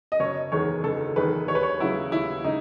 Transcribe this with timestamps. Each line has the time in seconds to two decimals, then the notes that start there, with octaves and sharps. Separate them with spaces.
0.12 D#5
0.20 F#1 C#5
0.52 E2 D#3 G#3 C#5
0.84 F#1 A4
1.16 E2 D#3 G#3 B4
1.48 D#2 C#5
1.55 B4
1.63 C#5
1.80 C#3 F#3 E4
2.12 D#2 E4
2.44 C#3 D#4